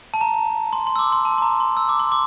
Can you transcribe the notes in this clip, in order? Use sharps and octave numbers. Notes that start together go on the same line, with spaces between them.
A5
A#5
C6
C6
E6
D6
C6
A5
C6
A#5
C6
E6
D6
C6
D6